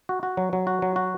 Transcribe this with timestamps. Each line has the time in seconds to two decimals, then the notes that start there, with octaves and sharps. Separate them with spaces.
0.09 F#4
0.23 F#4
0.37 F#3
0.53 F#3
0.67 F#4
0.82 F#3
0.96 F#4